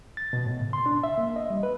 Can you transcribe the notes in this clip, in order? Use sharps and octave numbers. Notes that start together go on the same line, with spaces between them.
A6
B2
A2
C#3
C6
D4
E5
A#3
D#5
G3
B4